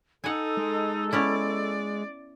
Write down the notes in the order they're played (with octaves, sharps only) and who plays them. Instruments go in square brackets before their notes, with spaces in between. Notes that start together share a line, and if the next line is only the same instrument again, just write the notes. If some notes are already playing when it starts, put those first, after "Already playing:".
[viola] D#4 [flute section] A4 [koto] F#5 G#5
[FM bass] G#3
[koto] B3 C#4 E4 [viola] D5